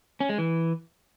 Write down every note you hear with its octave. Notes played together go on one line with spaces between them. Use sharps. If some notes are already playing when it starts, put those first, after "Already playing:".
C#4
G#3
E3